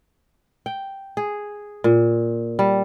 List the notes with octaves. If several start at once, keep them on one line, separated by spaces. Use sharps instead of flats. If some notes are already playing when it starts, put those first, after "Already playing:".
G5
G#4
A#2
G3